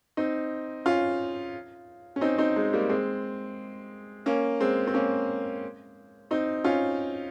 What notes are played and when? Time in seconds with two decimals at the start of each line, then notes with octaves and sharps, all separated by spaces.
0.17 C4 D#4
0.86 C#4 F4
2.16 C#4
2.21 C4 D#4
2.38 C4 D#4
2.56 G#3
2.73 G3 A#3
2.89 G#3 C4
4.26 A#3 C#4
4.61 G#3 C4
4.87 C4
4.94 A#3 C#4
6.31 C4 D#4
6.64 C#4 F4